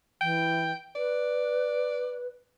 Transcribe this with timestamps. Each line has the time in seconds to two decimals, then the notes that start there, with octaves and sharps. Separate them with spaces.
0.21 E3 G5
0.95 B4 D5